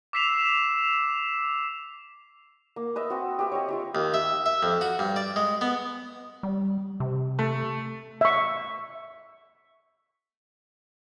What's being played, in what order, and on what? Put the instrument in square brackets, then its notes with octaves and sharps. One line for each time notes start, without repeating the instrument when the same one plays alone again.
[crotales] D6 E6 B6 C7 E7 F7
[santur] A#3
B4 D#5 E5
C4 F#4
G4 B4 E5
C#5 D#5
F4 G4 E5
[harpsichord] D#2
E5
E5
F2
F#4
G2
D5
G#3
B3
[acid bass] G3
C3
[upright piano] A3
[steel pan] E5 C#6